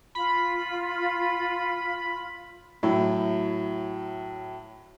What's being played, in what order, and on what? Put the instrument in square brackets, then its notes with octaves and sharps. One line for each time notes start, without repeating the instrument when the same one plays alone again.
[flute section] F4 [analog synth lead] B5
[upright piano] A2 F#3 E4